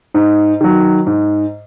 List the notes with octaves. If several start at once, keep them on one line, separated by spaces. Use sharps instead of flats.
G#2
D#3 F#3
G#2